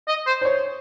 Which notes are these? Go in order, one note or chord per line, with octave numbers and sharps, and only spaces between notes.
D#5
C5
C5
C#5